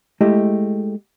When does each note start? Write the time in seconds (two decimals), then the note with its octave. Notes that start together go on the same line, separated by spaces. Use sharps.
0.21 G#3 A3 E4 G4 D#5